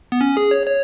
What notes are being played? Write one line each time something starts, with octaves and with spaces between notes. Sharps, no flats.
B3
C#4
G#4
C#5
C#5